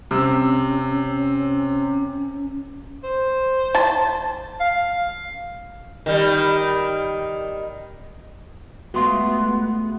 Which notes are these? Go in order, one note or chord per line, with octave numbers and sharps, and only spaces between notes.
C3 C#4 E6
C5
A5
F5
D#3 G3
G#3 A3 B3 F4 F#4 C6